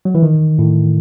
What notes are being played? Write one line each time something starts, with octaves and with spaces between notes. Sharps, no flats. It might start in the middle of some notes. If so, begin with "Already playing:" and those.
F#3
E3
D#3
A2